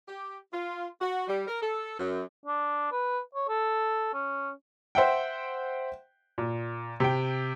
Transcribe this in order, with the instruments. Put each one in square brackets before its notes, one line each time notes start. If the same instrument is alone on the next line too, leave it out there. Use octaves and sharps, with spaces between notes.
[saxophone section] G4
F4
F#4
G3
A#4
A4
F#2
[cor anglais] D4
B4
C#5
A4
C#4
[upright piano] C5 E5 F#5 G5
A#2
C3 G5